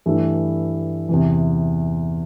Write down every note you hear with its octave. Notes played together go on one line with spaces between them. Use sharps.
G2 E3 A3 E4
E2 C3 E3